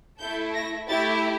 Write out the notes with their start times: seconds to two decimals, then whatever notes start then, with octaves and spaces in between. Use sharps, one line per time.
0.19 A3 E4 A4 G6
0.54 A#6
0.88 A3 E4 G4 A6